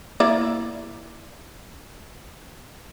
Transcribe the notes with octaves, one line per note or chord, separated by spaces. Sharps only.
A#3 E4 D5